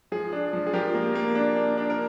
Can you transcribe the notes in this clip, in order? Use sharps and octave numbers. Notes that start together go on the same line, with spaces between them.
F3 G#4
D4
F3
G#4
F3 G4 A#4
A#3
A#3
D4
D4
D4
A#4